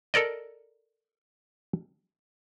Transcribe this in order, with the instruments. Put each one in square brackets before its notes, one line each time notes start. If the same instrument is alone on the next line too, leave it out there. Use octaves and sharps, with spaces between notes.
[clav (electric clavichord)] A4 A#4 D5 D#5